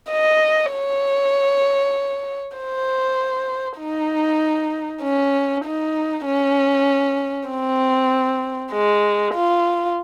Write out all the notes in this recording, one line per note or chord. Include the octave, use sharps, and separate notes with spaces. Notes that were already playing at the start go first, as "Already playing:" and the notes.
D#5
C#5
C5
D#4
C#4
D#4
C#4
C4
G#3
F4